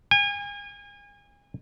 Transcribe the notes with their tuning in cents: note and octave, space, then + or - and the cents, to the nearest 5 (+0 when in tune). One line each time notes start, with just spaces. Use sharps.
G#5 -35